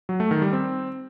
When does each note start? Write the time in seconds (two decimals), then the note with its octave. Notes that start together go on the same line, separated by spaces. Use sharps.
0.09 F#3
0.20 A3
0.31 D#3
0.42 G3
0.53 C4